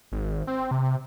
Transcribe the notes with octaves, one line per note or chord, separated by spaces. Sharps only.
G#1
C4
C3